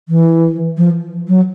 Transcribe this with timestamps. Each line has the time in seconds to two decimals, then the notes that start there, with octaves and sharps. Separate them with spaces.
0.09 E3
0.78 F3
1.28 F#3